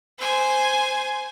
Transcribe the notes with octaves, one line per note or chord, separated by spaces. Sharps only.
C5 G#5